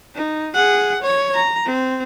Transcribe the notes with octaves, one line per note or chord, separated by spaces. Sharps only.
D#4
G#4 F#5
C#5
A#5
C4